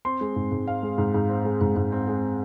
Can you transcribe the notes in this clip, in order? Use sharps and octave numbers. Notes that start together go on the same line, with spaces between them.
C4 C6
G#3
G#2
G#2
C4 F5
G#3
G#2
G#2
C4
G#3
G#2
G#2
C4
G#3